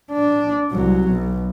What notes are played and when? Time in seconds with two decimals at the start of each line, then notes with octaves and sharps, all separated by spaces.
0.12 D4
0.72 C2 F#3
1.09 B1